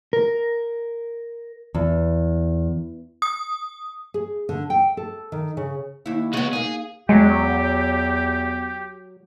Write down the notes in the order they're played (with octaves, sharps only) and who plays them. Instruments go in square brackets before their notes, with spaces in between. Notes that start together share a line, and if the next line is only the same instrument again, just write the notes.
[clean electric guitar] A#4
[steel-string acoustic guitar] E2
[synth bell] D#6
[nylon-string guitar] G#4
D3
G5
A4
D#3
C#3
[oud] D#2 E4
[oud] C#3 B3 [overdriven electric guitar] G#3 F#4
[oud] A#3 D#4 [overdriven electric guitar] G#4
[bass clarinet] E2 [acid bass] F#3 [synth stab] G#3 [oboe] G4